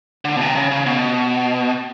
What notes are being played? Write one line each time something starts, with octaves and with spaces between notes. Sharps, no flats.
D3
B2
C3
C#3
C#3
B2